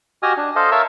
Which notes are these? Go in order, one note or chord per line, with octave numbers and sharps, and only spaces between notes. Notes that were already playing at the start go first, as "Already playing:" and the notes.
F#4 G4 D#5 G#5 D#6 F6
D4
A4 C5 D#5 F5
A#4 C#5 E5 F5 A5 E6